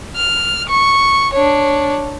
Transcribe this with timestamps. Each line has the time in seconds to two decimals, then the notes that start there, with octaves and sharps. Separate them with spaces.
0.17 F6
0.69 C#6
1.34 D4 C#5